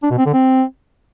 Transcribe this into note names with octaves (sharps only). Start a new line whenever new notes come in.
D4
B2
C4
D3
C4